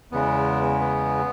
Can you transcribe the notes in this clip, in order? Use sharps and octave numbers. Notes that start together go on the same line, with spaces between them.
E2 C#3 G#3 B3
B3